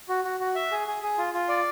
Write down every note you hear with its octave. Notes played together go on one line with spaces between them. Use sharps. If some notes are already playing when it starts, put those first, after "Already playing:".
F#4
F#4
F#4
E5
G#4
G#4
G#4
F4
F4
D5